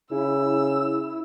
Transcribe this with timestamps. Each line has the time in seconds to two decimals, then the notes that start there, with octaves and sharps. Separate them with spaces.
0.11 C#3 E4 E6